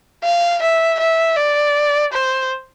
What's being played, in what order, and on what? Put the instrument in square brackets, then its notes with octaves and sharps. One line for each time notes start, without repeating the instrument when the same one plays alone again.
[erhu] F5
E5
E5
D5
C5